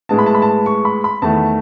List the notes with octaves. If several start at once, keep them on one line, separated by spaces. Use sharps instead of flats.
A2 G#3 B3 A5
B5
A5
B5
A5
C#6
B5
B5
E2 D#3 A3 A5